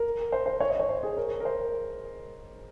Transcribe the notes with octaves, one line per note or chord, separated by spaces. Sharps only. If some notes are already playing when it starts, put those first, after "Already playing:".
Already playing: A#4
C5
C5
C#5
D#5
C#5
C5
G#4
A#4
A#4
C5